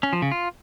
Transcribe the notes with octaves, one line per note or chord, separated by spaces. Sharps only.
C#4
F3
C#3
F4